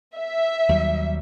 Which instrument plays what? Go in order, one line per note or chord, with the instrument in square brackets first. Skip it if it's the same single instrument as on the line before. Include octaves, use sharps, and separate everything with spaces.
[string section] E5
[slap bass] D#2 F#3 G3